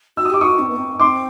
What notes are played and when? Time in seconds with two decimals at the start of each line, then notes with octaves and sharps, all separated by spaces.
0.17 F#4 E6
0.25 D#6
0.30 G4 D6
0.41 F#4 C#6 D#6
0.59 C4
0.68 B3
0.76 C4
1.00 C4 C6 D6